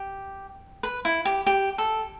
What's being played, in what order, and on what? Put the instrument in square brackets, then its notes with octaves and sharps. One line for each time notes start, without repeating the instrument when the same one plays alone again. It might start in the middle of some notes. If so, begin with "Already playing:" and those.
Already playing: [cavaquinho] G4
B4
E4
G4
G4
A4